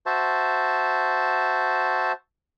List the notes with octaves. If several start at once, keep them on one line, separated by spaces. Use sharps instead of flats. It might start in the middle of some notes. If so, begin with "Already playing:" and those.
F#4 C5 E5 A5